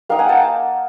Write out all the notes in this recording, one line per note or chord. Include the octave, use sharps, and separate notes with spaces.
A#3 D#4 F5 G5
F#5 G#5
G5 A5